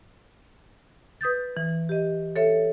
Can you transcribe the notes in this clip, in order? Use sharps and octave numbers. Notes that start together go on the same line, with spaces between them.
B4 D#6 G6 A6
E3
G4 D#5
A4 C#5 E5